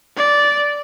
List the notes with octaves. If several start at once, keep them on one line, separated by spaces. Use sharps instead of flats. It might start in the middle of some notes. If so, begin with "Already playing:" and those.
D5